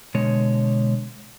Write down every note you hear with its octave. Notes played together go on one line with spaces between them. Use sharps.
B2 D3 G#3 C#5